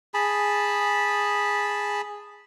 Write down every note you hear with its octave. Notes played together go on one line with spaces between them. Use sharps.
G#4 A5 B5